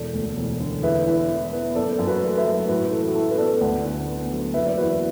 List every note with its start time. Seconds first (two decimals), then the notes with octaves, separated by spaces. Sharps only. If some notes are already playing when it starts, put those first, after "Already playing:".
Already playing: E1 A4 D5
0.14 D2
0.37 E1
0.60 D3
0.83 E2 B4 E5
1.07 E3
1.29 E4
1.53 B3
1.75 F#1 A4 D5
1.99 F#2
2.07 F#4 B4
2.22 A3
2.37 B4 E5
2.45 F#3
2.68 A2 F#4 B4
2.91 E3 A4
3.08 F#4
3.15 E4 A4
3.31 B4
3.38 B3 A4 D5
3.61 D2 D5 F#5
3.85 D3
4.07 B3
4.32 F#3
4.54 F#1 B4 E5
4.67 D5
4.77 E2 F#4 B4